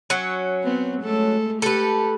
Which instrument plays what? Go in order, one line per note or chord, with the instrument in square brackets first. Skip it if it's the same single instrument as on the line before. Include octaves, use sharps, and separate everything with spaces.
[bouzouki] F#3 C#4
[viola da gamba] B3 C4
G#3 A3 A4
[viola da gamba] G4 [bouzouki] A4 B4